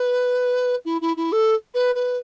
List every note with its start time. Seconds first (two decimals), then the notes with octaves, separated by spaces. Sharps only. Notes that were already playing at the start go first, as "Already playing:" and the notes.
Already playing: B4
0.85 E4
1.01 E4
1.17 E4
1.32 A4
1.74 B4
1.95 B4